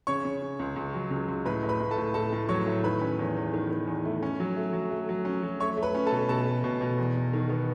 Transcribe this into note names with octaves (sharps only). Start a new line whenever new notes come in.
C#3 C#5 C#6
C#3
C#3
C#2
C#2
F#3
C#2
C#2
A2 B4 B5
A2
B4 B5
A2
A4 A5
A2
A2 A4 A5
A2
F#3 C#5 C#6
A2
D#3 B4 B5
C#4
E2
E2
D#3
D#3
E2
A3
C#4
F#3
A3
F#3
A3
F#3
C#4
F#3
A3 C#5 C#6
A3
B4 B5
C#4
A4 A5
B2
B2 A4 A5
A3
B2
B2
E2
E2
D#3
B3